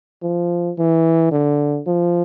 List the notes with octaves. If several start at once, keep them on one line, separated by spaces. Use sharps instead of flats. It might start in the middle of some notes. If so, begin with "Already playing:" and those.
F3
E3
D3
F3